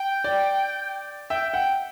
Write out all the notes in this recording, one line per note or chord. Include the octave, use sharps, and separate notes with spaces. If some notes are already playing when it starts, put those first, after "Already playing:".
Already playing: G5
D5
E5 G5
F#5 G5